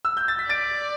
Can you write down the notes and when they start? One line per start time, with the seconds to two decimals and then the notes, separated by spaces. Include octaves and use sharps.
0.05 E6
0.17 G6
0.28 A6
0.39 B6
0.49 D5 A6 D7